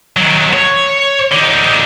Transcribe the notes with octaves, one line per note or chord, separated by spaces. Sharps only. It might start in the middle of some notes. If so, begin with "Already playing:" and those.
D#3 F#3
C#5
D3 D#4